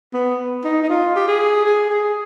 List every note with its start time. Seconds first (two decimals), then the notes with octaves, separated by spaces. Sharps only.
0.13 B3
0.64 D#4
0.82 D#4
0.89 F4
1.16 G4
1.28 G#4
1.65 G#4
1.90 G#4